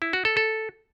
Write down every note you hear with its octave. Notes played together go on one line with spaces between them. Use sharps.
E4
F#4
A4
A4